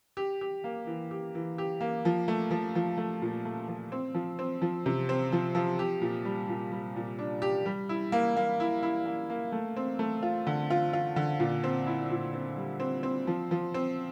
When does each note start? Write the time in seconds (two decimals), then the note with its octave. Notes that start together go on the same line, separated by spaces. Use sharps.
0.17 G4
0.41 G4
0.64 A#3
0.87 E3
1.11 G4
1.35 E3
1.58 G4
1.81 A#3
2.05 F3
2.28 A3
2.51 F3
2.75 F3
2.97 A3
3.22 A#2
3.45 A3
3.68 F3
3.92 C4
4.14 F3
4.39 C4
4.62 F3
4.86 C3
5.09 C4
5.32 F3
5.55 F3
5.79 G4
6.01 A#2
6.25 G3
6.49 A#2
6.72 G3
6.96 A#2
7.19 D4
7.42 G4
7.66 G3
7.89 E4
8.12 A#3
8.37 A#3
8.60 E4
8.83 E4
9.06 A#3
9.30 A#3
9.52 A3
9.76 C4
9.99 A3
10.23 F4
10.47 D3
10.70 F4
10.93 F4
11.16 D3
11.40 A#2
11.64 C4
11.86 E4
12.11 A#2
12.33 C4
12.56 G3
12.80 C4
13.03 C4
13.27 F3
13.51 F3
13.74 C4